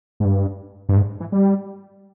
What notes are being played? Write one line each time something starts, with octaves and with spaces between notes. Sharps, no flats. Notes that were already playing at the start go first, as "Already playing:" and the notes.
G#2
G2
G2
G#2
E3
G3